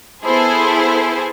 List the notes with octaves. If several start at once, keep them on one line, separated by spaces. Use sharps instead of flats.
B3 E4 G#4 A4 C5 G#5